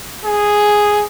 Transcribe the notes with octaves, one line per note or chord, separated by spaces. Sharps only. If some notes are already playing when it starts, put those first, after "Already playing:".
G#4